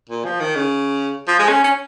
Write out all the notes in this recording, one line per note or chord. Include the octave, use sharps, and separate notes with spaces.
A#2
F3
D#3
C#3
F3
G#3
C#4
C#4